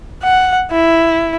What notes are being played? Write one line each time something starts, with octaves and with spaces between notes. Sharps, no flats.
F#5
E4